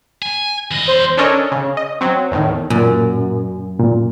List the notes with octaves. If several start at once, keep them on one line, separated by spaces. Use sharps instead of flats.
G#5
E2 D#5
C5
C#4 D4 A4 A#4 C#5 D#5
C#3
D#5
F#3 C4
E2 A2 D#3
F#2 A#2
A#2